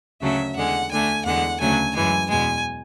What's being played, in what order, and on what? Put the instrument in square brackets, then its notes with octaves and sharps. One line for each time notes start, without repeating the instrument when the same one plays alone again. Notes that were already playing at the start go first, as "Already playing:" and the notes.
[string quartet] D2 C#3 F#3 A3 E5
E2 D3 G#3 F#5
D2 D3 A3 G#5
E2 D3 G#3 F#5
D2 C#3 F#3 A3 G#5
F#2 E3 G#3 G#5
E2 B2 G#3 G#5